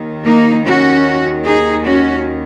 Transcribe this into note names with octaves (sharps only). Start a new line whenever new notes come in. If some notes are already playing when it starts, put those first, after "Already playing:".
Already playing: D#2 D#3
A#3 D#4
C#4 F#4
D#4 G#4
C#4 F#4